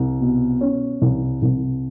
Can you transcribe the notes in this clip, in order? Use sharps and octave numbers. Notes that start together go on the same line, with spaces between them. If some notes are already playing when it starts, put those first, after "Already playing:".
Already playing: C2
B2
C#4
C2
C2